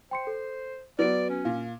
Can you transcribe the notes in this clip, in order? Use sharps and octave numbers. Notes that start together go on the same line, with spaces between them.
C5 G5 C6 C#7
A4
F#3 B3 B4 D5 D7
C#4
A#2 F5